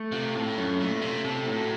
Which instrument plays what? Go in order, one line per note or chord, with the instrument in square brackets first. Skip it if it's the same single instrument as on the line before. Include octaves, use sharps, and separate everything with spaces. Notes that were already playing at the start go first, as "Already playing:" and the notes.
Already playing: [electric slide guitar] A3
[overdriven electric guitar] C3 [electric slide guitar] F4
[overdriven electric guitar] A2 [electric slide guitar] A4
[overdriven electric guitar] F#2 [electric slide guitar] C#4
[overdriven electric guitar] A#2 [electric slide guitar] A3
[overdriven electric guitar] C3 [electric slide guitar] F4
[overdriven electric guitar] C3 [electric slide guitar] A4
[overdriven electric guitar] A2 [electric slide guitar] F#3